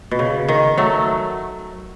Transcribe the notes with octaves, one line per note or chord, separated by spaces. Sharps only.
B2
C#3
D#3
F#3 A3